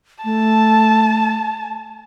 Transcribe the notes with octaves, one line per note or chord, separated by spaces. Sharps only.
A3 A5